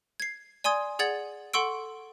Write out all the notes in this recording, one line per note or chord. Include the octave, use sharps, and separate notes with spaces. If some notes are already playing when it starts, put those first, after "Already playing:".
G#6 C7
D5 G#5 C6 D#6 G#6
G#4 D5 F#5 G#6 A6 F#7
A4 F#5 C6 C#6 E6 D7